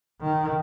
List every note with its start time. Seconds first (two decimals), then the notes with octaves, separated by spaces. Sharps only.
0.21 D#3